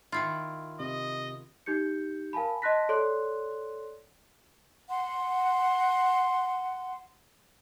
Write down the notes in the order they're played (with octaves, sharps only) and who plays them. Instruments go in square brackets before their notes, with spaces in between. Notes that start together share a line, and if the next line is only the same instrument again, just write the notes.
[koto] D#3 E4 F4
[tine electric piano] C3 [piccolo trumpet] D#5
[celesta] D#4 G4 G6 C#7
A#4 F5 G#5 A5 B5
D#5 A5 C6 F#6 A#6 B6
A4 C#5 D5 C6 F#6
[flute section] F#5 C6